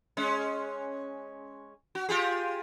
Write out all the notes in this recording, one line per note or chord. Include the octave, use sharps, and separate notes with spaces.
G#3 C#4
F#4
F4 G4 G#4